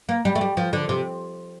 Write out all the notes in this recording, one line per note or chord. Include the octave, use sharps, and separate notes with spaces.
A#3
G3
A3
G3
F3
D3
C3